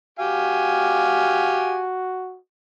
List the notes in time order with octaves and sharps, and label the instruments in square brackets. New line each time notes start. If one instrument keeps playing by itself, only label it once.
[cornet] F#4 [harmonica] G4 F5 G#5